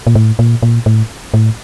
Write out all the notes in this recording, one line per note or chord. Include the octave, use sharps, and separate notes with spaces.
A#2
A2
A#2
A#2
A2
A2